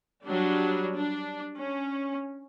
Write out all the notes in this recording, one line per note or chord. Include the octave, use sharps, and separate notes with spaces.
F#3 G3 D4
D4
C#4